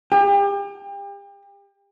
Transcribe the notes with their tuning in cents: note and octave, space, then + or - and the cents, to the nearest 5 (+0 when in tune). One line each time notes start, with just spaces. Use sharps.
G4 +35